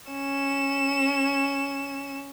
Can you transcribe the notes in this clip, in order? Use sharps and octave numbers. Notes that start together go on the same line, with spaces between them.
C#4 E7